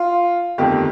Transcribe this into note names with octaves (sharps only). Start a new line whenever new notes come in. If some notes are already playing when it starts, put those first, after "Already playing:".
Already playing: F4
G1 F2 D#3 A3 G4